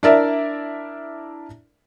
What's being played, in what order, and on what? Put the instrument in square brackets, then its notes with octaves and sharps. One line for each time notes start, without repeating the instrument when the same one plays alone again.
[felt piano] D4 E4 A#4 D5 E5